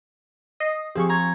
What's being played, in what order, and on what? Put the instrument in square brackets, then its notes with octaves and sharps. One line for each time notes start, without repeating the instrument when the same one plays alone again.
[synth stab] D#5 A#6 C7
[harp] F3 C4 [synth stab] G4 G#4 C#6
[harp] A#5 G#6